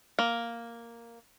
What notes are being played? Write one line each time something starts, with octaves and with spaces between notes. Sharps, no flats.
A#3